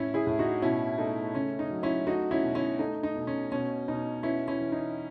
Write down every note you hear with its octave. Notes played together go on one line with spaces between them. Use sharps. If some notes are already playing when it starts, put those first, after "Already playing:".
Already playing: A2 C#4 E4
E4 G#4
A2
D#4 F#4
B2 C#4 E4
A3 D#4
C#3 C#4
D#4
F#3
C#4 E4
A3 D#4 F#4
C#4 E4
B2
C#4 E4
A3 D#4
D#4
B2
C#4
B2 C#4
B2 D#4
B3 C#4 E4
C#4 E4
E3
D#4